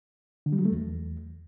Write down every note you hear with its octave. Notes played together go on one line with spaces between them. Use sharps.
D3
G3
F#3
A3
E2